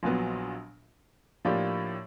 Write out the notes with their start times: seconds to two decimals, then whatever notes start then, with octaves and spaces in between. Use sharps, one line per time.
0.03 A#1 A#2 F#3 B3
1.45 A2 F3 A#3 D4 G4